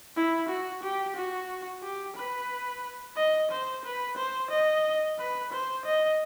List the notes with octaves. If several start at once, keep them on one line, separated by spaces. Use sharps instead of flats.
E4
F#4
G4
F#4
G4
B4
D#5
C5
B4
C5
D#5
B4
C5
D#5